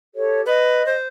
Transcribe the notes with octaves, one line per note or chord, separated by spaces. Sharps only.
G4 A4 C#5
B4 D#5
C5